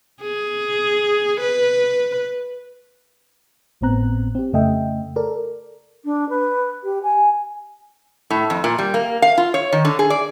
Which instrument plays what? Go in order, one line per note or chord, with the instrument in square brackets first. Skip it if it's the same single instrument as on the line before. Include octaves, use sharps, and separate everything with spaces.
[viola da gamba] G#4
B4
[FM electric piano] G#1 A2 B3 C4 A#5 F#6
C4 G4
F2 C#3 A3 D#5 E5 G5
A4 A#4 D5
[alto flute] D4
B4
G4
G#5
[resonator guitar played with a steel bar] A2
F2
A#2
G3
A#3
F5
F4
C#5
D#3
D3
G#4
D5